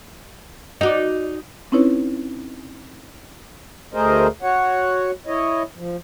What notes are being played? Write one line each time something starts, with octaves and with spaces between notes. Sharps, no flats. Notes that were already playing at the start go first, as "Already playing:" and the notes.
D#4 F#4 D5
C4 C#4 D#4 E4 B4 C#5
D2 A3 G#4 A#4 C5 D#5
F#4 C#5 F#5
E4 C#5 D#5
F3